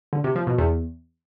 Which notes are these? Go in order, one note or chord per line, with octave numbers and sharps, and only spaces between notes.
D3
C3
F3
B2
E2